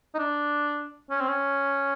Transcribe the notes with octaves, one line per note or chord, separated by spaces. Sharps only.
D#4
D4
C#4
C4
C#4